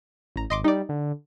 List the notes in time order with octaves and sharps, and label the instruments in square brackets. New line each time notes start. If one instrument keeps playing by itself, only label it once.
[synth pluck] A1 A#5
[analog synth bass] G#1 [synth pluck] D#5 C6 D6
[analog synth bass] G3 [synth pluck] D#4 D5
[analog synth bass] D3